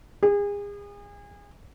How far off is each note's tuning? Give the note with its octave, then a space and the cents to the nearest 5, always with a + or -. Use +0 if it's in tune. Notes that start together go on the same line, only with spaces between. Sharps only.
G#4 -35